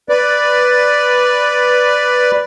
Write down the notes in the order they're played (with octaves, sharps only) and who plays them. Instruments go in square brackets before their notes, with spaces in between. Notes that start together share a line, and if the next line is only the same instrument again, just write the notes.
[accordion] B4 D5